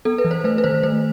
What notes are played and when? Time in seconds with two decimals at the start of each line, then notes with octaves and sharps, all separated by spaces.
0.05 B3 A4
0.18 B4
0.25 E3
0.31 C5
0.44 A3 B4
0.58 B4
0.64 D#3 C5
0.83 A3 C5